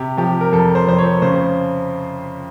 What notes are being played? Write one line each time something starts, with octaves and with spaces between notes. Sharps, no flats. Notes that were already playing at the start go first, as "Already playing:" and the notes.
Already playing: C3 G4
F3 G4
A#4
F2 A4
C5
F2 C5
C#5
C#3 C5